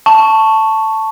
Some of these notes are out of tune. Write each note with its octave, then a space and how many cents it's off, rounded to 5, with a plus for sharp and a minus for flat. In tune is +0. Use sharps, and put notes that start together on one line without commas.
A5 +5 C#6 +0